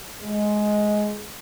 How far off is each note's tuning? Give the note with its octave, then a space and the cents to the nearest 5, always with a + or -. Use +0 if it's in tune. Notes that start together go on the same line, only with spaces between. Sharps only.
G#3 +10